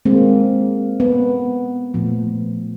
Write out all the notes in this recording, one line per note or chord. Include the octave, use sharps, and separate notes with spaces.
D#3 G#3 A#3 C4
B3
A#2 F3 A3